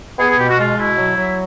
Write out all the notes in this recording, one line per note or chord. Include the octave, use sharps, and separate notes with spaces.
B3 G#4
G#4
B2 G4
F#4
G#3 F4
B2 E4
F#3
F#3